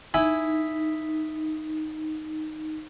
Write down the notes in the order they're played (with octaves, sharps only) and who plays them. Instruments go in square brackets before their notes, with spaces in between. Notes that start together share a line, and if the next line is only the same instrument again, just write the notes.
[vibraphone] D#4 [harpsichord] E4 G#5 B5